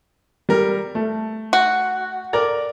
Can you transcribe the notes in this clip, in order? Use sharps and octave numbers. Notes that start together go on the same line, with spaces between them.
G3 A#4
A3
F#4
A#4 D5 A#5